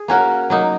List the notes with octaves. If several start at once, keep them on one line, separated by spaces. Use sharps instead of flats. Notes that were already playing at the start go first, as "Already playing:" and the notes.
Already playing: G#4
A#3 C#4 F#4 A#4
F#3 A#3 D#4